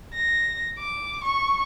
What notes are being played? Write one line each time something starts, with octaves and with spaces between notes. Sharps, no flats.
A#6
D6
C#6